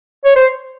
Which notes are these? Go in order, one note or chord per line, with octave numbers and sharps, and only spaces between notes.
C#5
C5